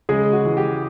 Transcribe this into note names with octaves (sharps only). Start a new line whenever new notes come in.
C#3 G#3 G#4
F#4
E3 G#3
G4